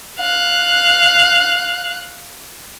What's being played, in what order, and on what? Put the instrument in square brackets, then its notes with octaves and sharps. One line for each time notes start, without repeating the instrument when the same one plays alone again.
[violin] F5 F#6